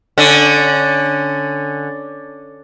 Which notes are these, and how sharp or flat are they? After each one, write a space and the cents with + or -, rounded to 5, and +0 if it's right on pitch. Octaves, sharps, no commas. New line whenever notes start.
D3 +0 C#4 +0